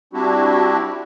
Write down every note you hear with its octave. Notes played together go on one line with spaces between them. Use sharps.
G3 C4 D4 E4 F#4 G4